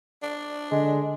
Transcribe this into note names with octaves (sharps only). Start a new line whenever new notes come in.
D4
D3 G#3